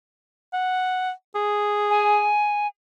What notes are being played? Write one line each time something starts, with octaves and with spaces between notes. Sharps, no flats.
F#5
G#4
G#5